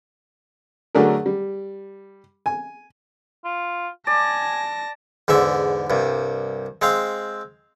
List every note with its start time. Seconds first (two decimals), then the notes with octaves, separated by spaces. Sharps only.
0.95 D3 F#3 A3 D4 G#4 A#4
1.26 G3
2.46 G#5
3.45 F4
4.07 D5 G#5 A5 A#6
5.28 E2 G#2 D3 E5
5.90 C2 G2
6.82 G#3 C4 F5